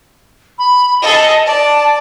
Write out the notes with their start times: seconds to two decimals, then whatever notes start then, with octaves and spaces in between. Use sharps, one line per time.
0.58 B5
1.02 G#4 A4 D#5
1.46 D5 A5